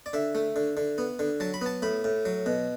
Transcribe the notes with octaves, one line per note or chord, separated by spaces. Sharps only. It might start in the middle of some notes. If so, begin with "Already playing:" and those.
D5
D3 E5
A3
D3
D3
B3
D3
F#3 A5
B5
B3 A5
A2 B5
A2
F#3
B2